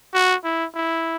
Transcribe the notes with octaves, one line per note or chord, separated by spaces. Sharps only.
F#4
E4
E4